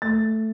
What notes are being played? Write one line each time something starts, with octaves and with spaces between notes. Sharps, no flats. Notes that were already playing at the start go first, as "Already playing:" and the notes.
A3 A6